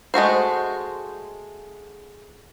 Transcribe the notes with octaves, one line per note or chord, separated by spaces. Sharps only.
G#3 A3 F#4 C5